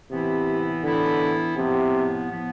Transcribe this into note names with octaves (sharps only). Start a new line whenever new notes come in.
A2 C3 E3 B3 E4
A2 D3 E3 B3 E4
A2 C3 F3 B3
A2 F3 B3